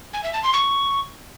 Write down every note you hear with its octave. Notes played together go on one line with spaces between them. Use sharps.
G#5
E5
A5
C6
C#6